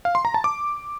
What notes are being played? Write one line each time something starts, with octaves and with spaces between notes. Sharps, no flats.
F5
C6
A#5
A5
D6